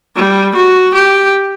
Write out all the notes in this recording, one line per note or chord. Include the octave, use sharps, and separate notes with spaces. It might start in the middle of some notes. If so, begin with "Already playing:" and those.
G3
F#4
G4